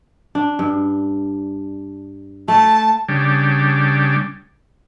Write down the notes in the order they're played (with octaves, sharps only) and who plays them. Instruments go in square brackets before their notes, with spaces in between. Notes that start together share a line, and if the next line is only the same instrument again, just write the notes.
[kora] D4
G2
[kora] A3 [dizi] A5
[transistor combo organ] C#3 G3 D4